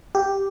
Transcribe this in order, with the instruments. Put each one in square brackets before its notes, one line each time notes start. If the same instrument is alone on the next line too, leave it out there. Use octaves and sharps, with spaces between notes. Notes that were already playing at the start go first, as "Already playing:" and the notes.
[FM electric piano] G4